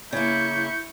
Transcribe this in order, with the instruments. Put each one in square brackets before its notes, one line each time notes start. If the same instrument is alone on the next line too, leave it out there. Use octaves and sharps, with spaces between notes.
[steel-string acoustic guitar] C#3 A#3 [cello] E4 [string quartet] C#6 G6